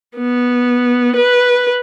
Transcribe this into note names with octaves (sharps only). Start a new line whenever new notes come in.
B3
B4